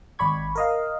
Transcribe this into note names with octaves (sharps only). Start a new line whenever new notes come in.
G#1 D5 B5 C#6 G#6
A#4 D#5 F5